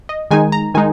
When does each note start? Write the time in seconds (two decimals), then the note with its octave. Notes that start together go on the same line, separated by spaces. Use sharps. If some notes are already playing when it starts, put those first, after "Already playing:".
0.09 D#5
0.31 D#3 G#3 D#4 G#5
0.52 A#5
0.74 D#3 G#3 D#4 G#5